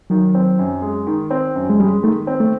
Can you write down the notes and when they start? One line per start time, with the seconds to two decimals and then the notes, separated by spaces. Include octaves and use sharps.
0.10 D#3 F#3
0.34 C4
0.59 F#2
0.82 G#3
1.07 D#3
1.31 C4
1.56 F#2
1.70 G#3
1.80 G3 G#3
2.03 D#3 A3
2.27 C4
2.40 A3